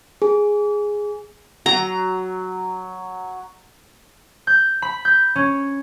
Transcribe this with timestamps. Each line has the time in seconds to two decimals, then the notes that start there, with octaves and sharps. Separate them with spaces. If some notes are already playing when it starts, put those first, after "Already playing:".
0.22 G#4
1.66 F#3 A#5
4.47 G6
4.82 B5
5.05 G6
5.36 C#4